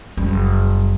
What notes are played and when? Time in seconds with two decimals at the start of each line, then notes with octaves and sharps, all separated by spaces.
0.17 F#1 G3